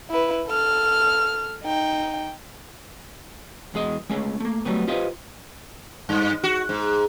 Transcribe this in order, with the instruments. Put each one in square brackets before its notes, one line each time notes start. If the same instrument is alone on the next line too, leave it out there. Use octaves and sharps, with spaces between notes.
[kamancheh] E4 B4
A4 F6
D#4 G5
[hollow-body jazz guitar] E2 G#3 G#4 D#5
G#3 A3 C#4 G#4
A3 A#3
F#3 G3 A3 B3
F4 G4 B4 C5 D#5 F5
[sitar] G2
F#4
G#2